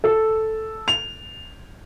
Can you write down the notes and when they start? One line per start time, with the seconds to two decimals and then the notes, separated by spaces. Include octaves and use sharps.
0.04 A4
0.88 F7